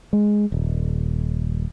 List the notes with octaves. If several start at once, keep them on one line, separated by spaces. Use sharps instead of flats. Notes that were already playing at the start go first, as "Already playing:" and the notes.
G#3
D#1